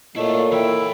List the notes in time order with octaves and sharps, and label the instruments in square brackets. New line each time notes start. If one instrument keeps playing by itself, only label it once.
[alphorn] A#2 [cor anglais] A3 [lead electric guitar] E4 F4 [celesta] A4 C#5 D#5
[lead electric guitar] E3 G5 [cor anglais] E4